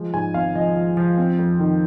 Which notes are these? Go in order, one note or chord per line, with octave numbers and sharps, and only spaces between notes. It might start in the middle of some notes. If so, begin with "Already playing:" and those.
Already playing: F3 G#3
G#2 G#5
G#1 F5
F3 D#5
F3
F3
C4
F2
D#3